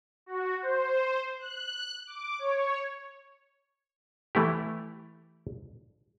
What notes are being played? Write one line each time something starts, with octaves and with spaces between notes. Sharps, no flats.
F#4
C5
F#6
D6
C#5
E3 A3 E4 G4